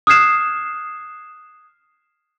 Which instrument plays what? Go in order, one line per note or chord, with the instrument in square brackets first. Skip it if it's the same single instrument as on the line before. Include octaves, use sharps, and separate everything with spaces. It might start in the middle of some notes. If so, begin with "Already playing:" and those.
[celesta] D#6 F6 F#6 G#6 C7 E7